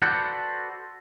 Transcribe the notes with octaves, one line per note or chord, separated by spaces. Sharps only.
F#4 A4 B4 C5 D5 F#5